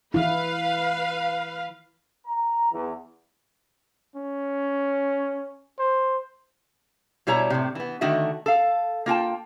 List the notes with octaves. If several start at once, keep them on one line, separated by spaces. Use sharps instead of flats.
E3 E4 B4 F5
A#5
E2
C#4
C5
B2 G3 E4 C#5 A#5
A2 C3
E3 B3
D3 D#3 A3 F#4 E5
A4 F5
A#3 F4 G5 A5